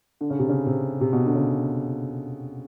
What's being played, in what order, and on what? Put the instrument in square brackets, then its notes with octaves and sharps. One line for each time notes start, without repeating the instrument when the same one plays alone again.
[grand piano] D3
C#3
C3
C#3
C3
C3
B2
D3
C#3